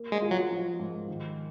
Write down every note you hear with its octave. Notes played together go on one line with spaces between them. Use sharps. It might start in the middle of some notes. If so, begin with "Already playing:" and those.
Already playing: A#3
G#3
F4
F#3
F3
G#2
D#3